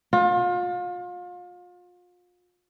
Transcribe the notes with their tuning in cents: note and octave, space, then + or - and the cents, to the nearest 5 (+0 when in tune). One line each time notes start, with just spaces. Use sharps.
F4 +35